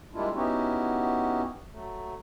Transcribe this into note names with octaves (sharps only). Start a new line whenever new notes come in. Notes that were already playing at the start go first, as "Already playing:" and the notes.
G3 G#3 A#3 D4 E4 F4
B3 C#4 D#4 E4 F#4 G4
F#3 A3